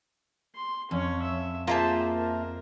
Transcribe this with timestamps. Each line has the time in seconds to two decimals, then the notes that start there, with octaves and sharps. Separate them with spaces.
0.55 C6
0.91 F2 C#4 C#5
1.23 E5
1.67 A#3 F4 G#4 C5 E5 A5
2.14 A#4